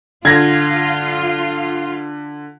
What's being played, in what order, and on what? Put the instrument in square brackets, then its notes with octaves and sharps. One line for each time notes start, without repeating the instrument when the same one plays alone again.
[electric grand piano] D3 [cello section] F4 [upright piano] G#6 A#6